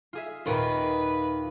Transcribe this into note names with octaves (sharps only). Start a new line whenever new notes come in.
F4 G#4 E5
D#2 A#2 D#3 F4 B4